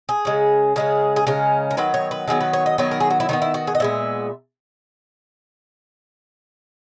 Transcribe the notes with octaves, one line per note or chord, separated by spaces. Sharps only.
G#4
C#3 G#3 C#4
C#3 G#3 C#4 G#4
G#4
C#3 G#3 C#4 A#4
A#4
D#3 F#3 B3 B4
C#5
B4
D#3 F#3 B3 G#4
B4
C#5
D#5
D#3 F#3 B3 C#5
A#4
G#4
F#4
E4
D#3 F#3 B3 D#4
E4
F#4
G#4
D#5
A#2 G#3 B3 E5